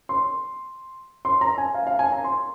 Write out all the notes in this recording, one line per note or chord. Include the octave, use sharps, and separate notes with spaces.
C6
C6
A#5
G#5
F5
F5
G#5
A#5
C6